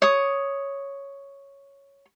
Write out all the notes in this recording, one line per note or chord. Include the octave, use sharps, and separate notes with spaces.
C#5 D#6